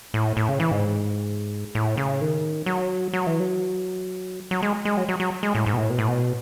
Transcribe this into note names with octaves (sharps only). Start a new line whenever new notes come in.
A2
A2
C#3
E3
G#2
A2
C#3
D#3
F#3
F#3
E3
F#3
F#3
G#3
G#3
F#3
F#3
F#3
G#3
A2
G#2
B2
A2
B2
A2
B2